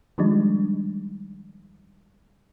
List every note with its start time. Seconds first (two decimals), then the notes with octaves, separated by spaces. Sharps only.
0.18 D#3 F3 G3 G#3 D4 D#4